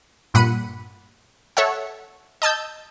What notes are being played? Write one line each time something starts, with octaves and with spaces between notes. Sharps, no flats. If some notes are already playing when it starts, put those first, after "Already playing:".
G2 A#2 F#5 B5 C#7 D#7
A4 C#5 E5 F#5
D#5 A5 E6 G6